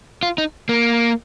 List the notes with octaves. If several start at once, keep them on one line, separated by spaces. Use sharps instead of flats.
F4
D#4
A#3